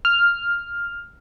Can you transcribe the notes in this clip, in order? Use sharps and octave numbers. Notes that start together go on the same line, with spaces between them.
F6